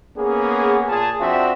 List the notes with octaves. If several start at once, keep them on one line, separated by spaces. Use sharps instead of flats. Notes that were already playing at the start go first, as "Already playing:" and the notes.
A#3 B3 C#4 G#4
A#2 G#4 A5
F3 C4 D4 F#4 E5